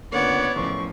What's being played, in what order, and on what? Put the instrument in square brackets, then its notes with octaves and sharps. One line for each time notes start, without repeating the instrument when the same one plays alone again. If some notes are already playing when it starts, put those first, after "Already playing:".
[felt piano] C#2 D3 A#3 [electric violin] B3 D5 [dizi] C#5 [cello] F#5
[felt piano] F#1 A2 [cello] C#3 F3 [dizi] C#6